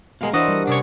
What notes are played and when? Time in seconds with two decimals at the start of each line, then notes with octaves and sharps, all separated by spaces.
0.21 B2 G#3 A#4 F5
0.33 E3 D4 F#4 C5 C#5 D#5 F#5
0.48 G3
0.67 C3 C#4 D4 G#4 A#4 C#5